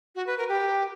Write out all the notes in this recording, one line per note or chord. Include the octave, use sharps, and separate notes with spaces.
F#4
B4
A#4
G4